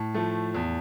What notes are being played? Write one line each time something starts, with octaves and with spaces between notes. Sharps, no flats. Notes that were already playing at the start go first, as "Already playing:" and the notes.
Already playing: A2 A5
F3 A3
E2